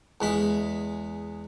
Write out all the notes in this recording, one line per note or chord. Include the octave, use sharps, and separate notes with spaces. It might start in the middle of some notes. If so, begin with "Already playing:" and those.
E2 G#3 B5